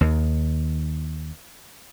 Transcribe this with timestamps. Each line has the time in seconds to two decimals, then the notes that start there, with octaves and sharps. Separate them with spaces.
0.01 D#2 D#3